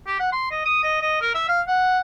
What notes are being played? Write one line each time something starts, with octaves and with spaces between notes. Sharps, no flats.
G4
F#5
C6
D#5
D#6
D#5
D#5
A#4
E5
F5
F#5